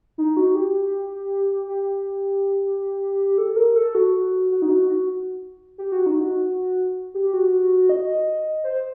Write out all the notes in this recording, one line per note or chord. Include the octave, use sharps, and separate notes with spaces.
D#4
F#4
G4
G4
A4
A#4
A4
F#4
F#4
D#4
F#4
F#4
G4
F#4
D#4
F#4
G4
F#4
D#5
C5